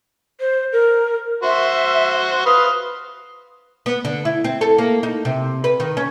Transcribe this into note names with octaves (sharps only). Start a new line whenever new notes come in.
C5
A#4
F#4 C5 E5 C6
B4 F5 C6 D#6
B3
D3
E4
C4
A4
A#3
D#4
C3
B4
D#3
C#4